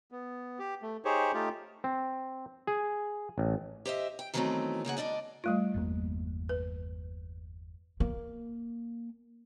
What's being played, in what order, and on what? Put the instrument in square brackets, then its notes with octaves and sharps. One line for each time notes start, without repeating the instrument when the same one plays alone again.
[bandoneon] B3
G4
A3
D#4 G4 G#4 C5 C#5
A3 D#4 F4 G4
[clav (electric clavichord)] C4
G#4
A1
[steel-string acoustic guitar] G4 C5 D#5 E5
G5
D#3 E3 F#3 A3 B3 C4
C#3 A#3 G#4 F#5
G#2 F#3 D4 D5 D#5
[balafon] G3 A3 F4
[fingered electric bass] G1 E2 A#3
[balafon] B4
[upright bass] A#3